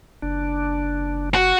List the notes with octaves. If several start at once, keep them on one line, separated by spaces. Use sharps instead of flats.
F#1 D4
F#4